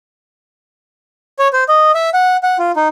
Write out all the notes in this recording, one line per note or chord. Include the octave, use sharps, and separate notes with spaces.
C#5
C5
D#5
E5
F#5
F#5
F4
D#4